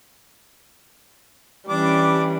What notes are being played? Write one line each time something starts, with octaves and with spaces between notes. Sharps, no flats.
E3 G3 C#4 D4 D6